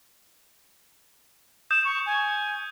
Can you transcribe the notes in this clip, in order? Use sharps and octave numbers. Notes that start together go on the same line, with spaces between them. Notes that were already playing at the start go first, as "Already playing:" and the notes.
D#6 G6 E7
C#6
G#5